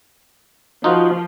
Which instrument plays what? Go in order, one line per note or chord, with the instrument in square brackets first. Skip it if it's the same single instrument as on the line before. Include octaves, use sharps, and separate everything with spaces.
[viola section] F3 [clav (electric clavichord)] D#4 F4 F#4